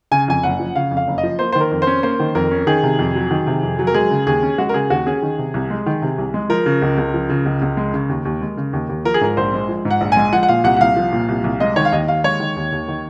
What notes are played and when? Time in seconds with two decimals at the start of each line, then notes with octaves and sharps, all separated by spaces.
0.11 C#3 G#5
0.28 F2 G#5
0.43 F#1 F#5
0.60 F3
0.76 C#3 F5
0.91 F2
0.97 F5
1.07 F#1
1.18 D#5
1.23 F3
1.39 A#3 C5
1.52 D#3 C5
1.61 A#4
1.71 F2
1.82 C#4 C5
2.03 A#3 C5
2.20 D#3
2.35 F2 A#4
2.51 C#4
2.67 D#3 G#4
2.83 C3
2.99 F2
3.15 F#3
3.31 D#3
3.47 C3
3.63 F2
3.79 F#3
3.87 A#4
3.94 G#3 G#4
4.11 C#3
4.27 D#2 G#4
4.43 C#4
4.58 G#3 F#4
4.69 A#4
4.74 C#3 G#4
4.90 D#2 F#4
5.06 C#4 G#4
5.22 D#3
5.38 C3
5.54 C2
5.70 G#3
5.86 D#3
6.02 C3
6.18 C2
6.34 G#3
6.50 F3 A#4
6.66 C#3
6.82 C#2
6.98 C#2
7.14 F3
7.30 C#3
7.46 C#2
7.62 C#2
7.77 G#3
7.94 C#3
8.09 D#2
8.25 D#2
8.41 G#3
8.57 C#3
8.73 D#2
8.89 D#2
9.05 F3 A#4
9.14 G#4
9.21 G#2 A#4
9.37 A#1 C5
9.53 G#3
9.69 F3
9.85 G#2
9.91 F#5
10.01 A#1
10.12 G#3 G#5
10.32 F3 F#5
10.43 F#5
10.49 A#2 F5
10.64 C2 F#5
10.76 F#5
10.81 C2 F5
10.97 F3
11.12 A#2
11.29 C2
11.44 C2
11.60 G#3 D#5
11.76 D#3 C#5
11.85 F5
11.92 D#2 D#5
12.08 D#2 F5
12.24 G#3 C#5
12.40 D#3
12.56 D#2
12.72 D#2
12.88 D#3